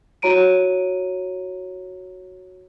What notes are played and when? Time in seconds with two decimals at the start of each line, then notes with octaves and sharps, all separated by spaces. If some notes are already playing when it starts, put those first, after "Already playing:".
0.22 E4 F#4 C#5 A#5 D7 D#7